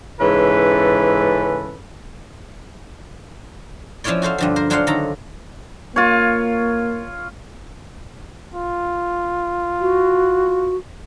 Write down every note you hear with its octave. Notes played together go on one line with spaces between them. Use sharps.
G#2 C#3 E3 C#4 A4 B4
F3 C#4 E4 F4 C#5 D5
F#4 A4 C5 F5
G2 D3 F3
A#4 C5
F#3 D4 F4 C5 F5 F#5
D3 D#3 A4 A#5
A#3 F4 C#5
F4
F#4